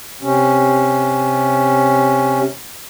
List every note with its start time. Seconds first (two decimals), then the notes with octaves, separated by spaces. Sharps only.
0.22 C3 C#4